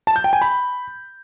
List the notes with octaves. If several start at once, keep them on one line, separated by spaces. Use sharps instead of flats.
A5
G6
G5
G#5
B5